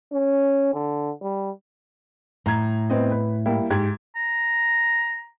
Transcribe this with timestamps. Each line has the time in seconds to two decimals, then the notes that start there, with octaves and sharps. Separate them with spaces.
0.13 C#4
0.74 D3
1.22 G3
2.46 A2 A#5 G#6
2.90 B3 C4 D#5
3.11 B4
3.46 G3 A#3 E4
3.70 G#2 G4 G#6
4.16 A#5